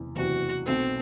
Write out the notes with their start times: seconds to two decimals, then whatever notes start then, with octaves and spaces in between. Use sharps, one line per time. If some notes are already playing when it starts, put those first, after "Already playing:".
Already playing: F#1 E2 C3 E3
0.16 F#1 E2 C3 E3 F#4
0.66 B1 B2 A3 C4